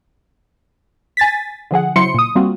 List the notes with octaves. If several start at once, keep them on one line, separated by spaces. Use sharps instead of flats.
G#5 A6 B6
D3 F3 G#4 F#5
C#3 F#3 E4 C5 C6 C#7
A#2 D#6
G3 A#3 C4 F4 F#4